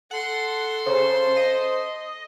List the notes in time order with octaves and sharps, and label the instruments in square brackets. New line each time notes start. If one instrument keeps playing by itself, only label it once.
[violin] A4 C6 [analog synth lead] F#5
[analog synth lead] C#3 [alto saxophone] C5
[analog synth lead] D#5